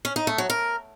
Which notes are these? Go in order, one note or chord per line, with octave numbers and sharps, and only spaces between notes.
C#4
D#4
A3
F#3
A#4